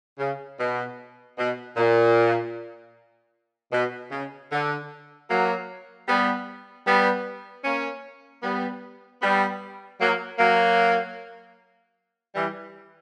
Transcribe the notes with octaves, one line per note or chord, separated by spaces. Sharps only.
C#3
B2
B2
A#2
B2
C#3
D3
F#3 A#3
G3 B3
G3 B3
A#3 C#4
G3 B3
G3 B3
F#3 A#3
F#3 A#3
E3 G3